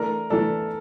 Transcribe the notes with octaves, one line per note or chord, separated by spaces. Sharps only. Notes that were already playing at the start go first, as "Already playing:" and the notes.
Already playing: E3 A3 D4 A#4
E3 A3 D4 A4